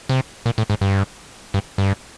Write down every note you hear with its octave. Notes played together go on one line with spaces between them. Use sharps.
C3
A#2
A2
G#2
G2
G2
G2